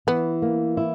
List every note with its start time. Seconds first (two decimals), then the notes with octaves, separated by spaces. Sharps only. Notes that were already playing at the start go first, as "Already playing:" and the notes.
0.07 E3 B3
0.42 A#3
0.77 E4